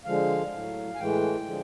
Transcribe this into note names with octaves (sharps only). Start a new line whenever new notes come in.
D3 F3 G#3 F5
A2
F#3
G#5
A2 E3 G#3 G5
D3 F3 G#3